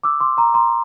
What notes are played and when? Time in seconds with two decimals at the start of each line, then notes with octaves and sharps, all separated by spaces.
0.03 D6 E6
0.20 C6 D6
0.37 A#5 C6
0.54 A#5 C6